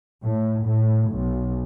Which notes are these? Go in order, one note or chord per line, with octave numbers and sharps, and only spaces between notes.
A2
A2
B1